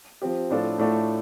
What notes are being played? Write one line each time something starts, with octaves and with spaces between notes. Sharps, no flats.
F3 C4 G4
A2 F3 D4 F4 A4
A2 A3 D4 F4 A4